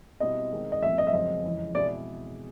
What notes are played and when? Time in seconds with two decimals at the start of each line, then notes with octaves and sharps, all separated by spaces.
0.20 B2 G3 C4 E4 D#5
0.52 D#3 G#3 C4
0.72 D#5
0.82 C2 A#2 F3 A3 C4 E5
0.98 D#5
1.07 E5
1.13 F#2 C#3 F3 G#3 C4 D#5
1.44 F2 C#3 E3 G#3
1.75 B2 G#3 C4 E4 G#4 D5